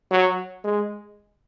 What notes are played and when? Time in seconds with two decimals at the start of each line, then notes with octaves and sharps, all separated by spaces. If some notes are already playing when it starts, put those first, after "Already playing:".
0.11 F#3
0.64 G#3